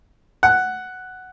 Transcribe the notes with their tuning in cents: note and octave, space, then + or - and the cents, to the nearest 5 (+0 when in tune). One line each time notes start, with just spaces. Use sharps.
F#5 +5